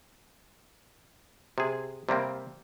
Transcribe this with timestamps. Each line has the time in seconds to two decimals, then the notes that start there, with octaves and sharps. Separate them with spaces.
1.58 C3 G#4
2.09 C3 G3 A#3 C4